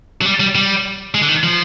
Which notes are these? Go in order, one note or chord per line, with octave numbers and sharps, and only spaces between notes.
F#3
G3
G3
G3
G#3
D3
D#3
F3